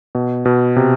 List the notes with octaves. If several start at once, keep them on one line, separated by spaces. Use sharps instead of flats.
B2
B2
C3